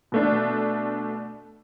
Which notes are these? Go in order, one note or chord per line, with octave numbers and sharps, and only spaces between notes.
B2 A3 D4